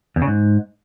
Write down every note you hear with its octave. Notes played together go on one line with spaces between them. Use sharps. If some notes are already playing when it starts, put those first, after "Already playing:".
E2
C#3
G#2